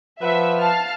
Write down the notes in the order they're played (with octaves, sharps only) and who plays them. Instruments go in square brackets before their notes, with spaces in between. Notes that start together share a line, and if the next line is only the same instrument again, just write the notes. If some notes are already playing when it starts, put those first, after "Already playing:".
[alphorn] F3 [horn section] B4 F#5 [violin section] E5
[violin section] F5 A5 F6